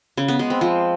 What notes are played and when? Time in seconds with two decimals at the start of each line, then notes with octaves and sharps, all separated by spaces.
0.17 C#3
0.28 B3
0.39 G#3
0.50 C4
0.61 F3